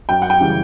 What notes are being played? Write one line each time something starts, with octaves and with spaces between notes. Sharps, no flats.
F#2 G5
F#5
G5
C#3 E3 G3